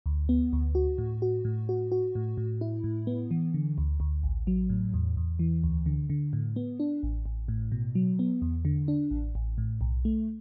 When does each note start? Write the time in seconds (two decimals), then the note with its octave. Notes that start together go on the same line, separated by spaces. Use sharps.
0.06 D2
0.29 B3
0.53 D2
0.75 F#4
0.98 A2
1.22 F#4
1.45 A2
1.69 F#4
1.92 F#4
2.15 A2
2.37 A2
2.61 E4
2.84 A2
3.07 B3
3.31 E3
3.54 D3
3.78 D2
4.00 D2
4.23 A1
4.47 F#3
4.70 A2
4.94 E2
5.17 E2
5.39 E3
5.64 D2
5.86 D3
6.10 D3
6.33 A2
6.56 B3
6.80 D4
7.03 A1
7.26 A1
7.48 A2
7.72 B2
7.95 F#3
8.19 B3
8.42 E2
8.65 D3
8.88 D4
9.11 A1
9.35 A1
9.58 A2
9.81 B1
10.05 A3